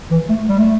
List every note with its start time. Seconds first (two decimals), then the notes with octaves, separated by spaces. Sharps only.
0.11 E3
0.30 A3
0.49 G3
0.59 A3